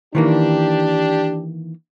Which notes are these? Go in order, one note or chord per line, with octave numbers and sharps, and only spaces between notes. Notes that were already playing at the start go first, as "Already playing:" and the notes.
D#3 E3 A#3 D4 G4